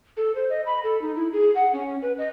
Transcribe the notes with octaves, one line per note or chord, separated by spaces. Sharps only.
A4
C5
D#5
B5
A4
D#4
E4
G#4
F#5
C#4
B4
D#5